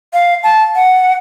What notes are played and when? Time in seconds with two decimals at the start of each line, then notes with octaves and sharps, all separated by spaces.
0.13 F5
0.43 A5
0.75 F#5